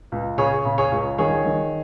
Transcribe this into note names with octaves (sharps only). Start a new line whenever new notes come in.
C#2
C#3 G#4 C#5
C#3
G#4 C#5
C#2
D#3 G#4 C#5
D#3